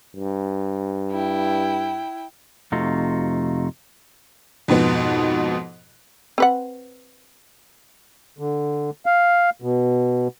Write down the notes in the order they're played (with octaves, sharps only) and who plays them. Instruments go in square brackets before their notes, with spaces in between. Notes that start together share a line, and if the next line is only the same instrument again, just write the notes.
[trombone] G2
[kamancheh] E4 G5
[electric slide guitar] F2 C3 A3 D#4 F4 F#4
[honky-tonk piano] F2 G#2 B2 B3
[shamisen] C4 B4 F#5
[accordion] D3
F5
B2